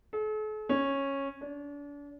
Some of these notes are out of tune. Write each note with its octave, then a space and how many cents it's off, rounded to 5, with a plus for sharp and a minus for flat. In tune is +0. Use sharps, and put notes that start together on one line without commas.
A4 -45
C#4 -10
D4 -35